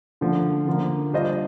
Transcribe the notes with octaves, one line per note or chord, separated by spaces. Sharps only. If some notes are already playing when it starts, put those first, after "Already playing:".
D3 F3 A3
D3 F3 A#3
G3 D4 F4 C5 D#5